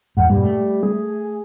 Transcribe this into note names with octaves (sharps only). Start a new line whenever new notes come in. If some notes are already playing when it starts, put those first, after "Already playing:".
E2 G#2 F#5
G2 A#2 G3
A3
G#4